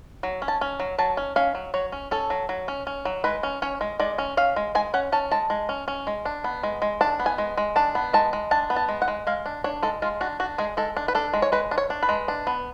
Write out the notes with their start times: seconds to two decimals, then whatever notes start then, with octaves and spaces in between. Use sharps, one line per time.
0.23 F#3
0.42 C#4
0.48 A5
0.61 C#4
0.80 F#3
0.98 F#3 A5
1.17 C#4
1.36 C#4 F5
1.55 F#3
1.74 F#3 C#5
1.92 C#4
2.11 C#4 A4
2.30 F#3
2.49 F#3
2.68 C#4
2.87 C#4
3.05 F#3
3.24 G#3 B4
3.43 C#4
3.62 C#4 C#5
3.81 G#3
4.00 G#3 D5
4.18 C#4
4.37 C#4 F5
4.56 G#3
4.75 G#3 G#5
4.94 C#4 F#5
5.12 C#4 A5
5.31 G#3 A5
5.50 G#3
5.69 C#4
5.88 C#4
6.07 G#3
6.25 D4
6.44 B3
6.63 G#3
6.82 G#3
7.01 D4 A5
7.20 B3
7.26 G#5
7.38 G#3
7.57 G#3
7.76 D4 A5
7.95 B3
8.13 G#3 A5
8.33 G#3
8.51 D4 A5
8.70 B3
8.76 A5
8.89 G#3
9.02 F#5
9.08 G#3
9.27 G#3 F5
9.46 D4
9.64 D4 C#5
9.83 G#3 A4
10.02 G#3 F4
10.21 D4 F#4
10.40 D4 F#4
10.58 G#3 G#4
10.77 G#3 A4
10.97 D4
11.08 B4
11.15 D4 A4
11.33 G#3
11.42 C#5
11.52 G#3 B4
11.71 D4
11.78 C#5
11.90 D4
12.03 B4
12.09 G#3
12.28 D4
12.47 B3